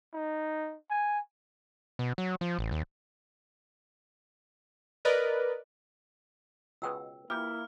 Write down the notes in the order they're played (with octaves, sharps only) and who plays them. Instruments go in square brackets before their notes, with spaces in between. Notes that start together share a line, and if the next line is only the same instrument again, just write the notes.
[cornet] D#4
G#5
[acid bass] B2
F#3
F3
A1
D#2
[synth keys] A#4 B4 D5 D#5
[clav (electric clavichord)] C#2 B2 G#3 [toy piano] B4 G5 E6
[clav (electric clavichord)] E3 G4 [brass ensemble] A#3 E4 [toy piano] F4 [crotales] F6